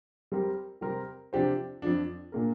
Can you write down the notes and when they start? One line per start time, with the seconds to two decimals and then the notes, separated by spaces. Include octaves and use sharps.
0.32 G3 C4 G4 A#4
0.81 C3 G3 C4 G4 A#4
1.33 C3 F3 D4 G4 C5
1.82 F2 F3 D4
2.32 A#2 A#3 D4 A#4